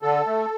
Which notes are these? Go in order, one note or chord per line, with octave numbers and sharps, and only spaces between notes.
D3 A4
A3